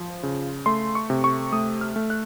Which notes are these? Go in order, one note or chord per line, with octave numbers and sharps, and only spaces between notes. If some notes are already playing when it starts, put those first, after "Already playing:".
Already playing: F3
C#3
A3 C6
C#6
C3
C#6
A3 D#6
F6
A3
F#6